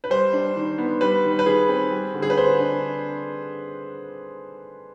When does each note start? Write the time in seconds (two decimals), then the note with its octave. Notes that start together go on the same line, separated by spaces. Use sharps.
0.04 B4
0.10 G3 C5
0.33 D4
0.56 D#3
0.78 B3
1.01 G3 B4
1.24 D#3
1.39 B4
1.46 D#3 G#4
1.69 C4
1.91 G3
2.14 D3
2.22 G#4
2.30 B4
2.37 D3 C5
2.59 D4